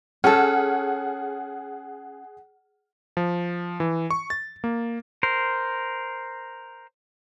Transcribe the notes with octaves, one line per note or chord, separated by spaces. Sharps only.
C#4 G#4 A4 F#5 F6
F3
E3
C#6
A6
A#3
A#4 C5